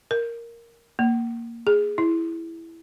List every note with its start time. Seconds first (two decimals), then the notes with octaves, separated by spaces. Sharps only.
0.11 A#4
0.99 A#3
1.67 G#4
1.98 E4